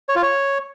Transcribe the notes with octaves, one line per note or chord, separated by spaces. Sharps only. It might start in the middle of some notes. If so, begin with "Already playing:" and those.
C#5
F4
C#5